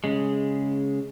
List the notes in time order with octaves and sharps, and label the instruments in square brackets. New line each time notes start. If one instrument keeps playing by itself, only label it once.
[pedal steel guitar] C#3 G#3